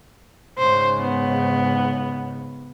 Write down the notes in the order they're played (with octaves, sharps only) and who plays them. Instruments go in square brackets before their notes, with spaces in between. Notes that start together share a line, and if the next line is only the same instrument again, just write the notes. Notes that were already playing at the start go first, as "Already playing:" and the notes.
[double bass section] G#2 C#3 [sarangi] C5
[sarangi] B3